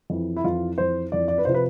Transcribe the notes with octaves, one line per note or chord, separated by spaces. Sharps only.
F2 E3
E4
F2 E3 F4
F2 E3 C5
F2 E3 D5
D5
B4
C3 F3 C5
B4